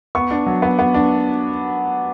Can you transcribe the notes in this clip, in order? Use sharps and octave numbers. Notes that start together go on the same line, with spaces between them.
B3 C#6
D4
F#3
B3
B3
D4